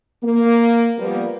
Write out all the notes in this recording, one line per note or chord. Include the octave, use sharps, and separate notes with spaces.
A#3
F3 G3 A#3 B3